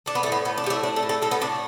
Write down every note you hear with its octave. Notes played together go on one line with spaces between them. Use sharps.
A3 D4
B3
A2 A3
B3
A2 B3
D4
A3 G4
E4
A3 D4
A4
A2
A4
A2 A4
B3
A3 D4